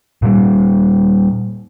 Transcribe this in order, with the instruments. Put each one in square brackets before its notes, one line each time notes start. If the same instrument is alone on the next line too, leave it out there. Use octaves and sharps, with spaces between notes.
[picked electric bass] A#2 G3